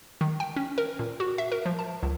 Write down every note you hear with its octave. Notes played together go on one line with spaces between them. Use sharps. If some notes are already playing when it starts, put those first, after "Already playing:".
D#3
G5
C#4
A#4
A#2
F#4
E5
A#4
F3
A5
C#2